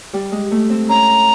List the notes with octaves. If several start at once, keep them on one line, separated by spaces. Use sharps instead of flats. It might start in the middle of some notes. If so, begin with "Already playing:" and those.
G3
G#3
A3
C4
C#4 A#5